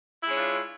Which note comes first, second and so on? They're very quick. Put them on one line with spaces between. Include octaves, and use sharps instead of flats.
E4 G#3 C#5 D4 F4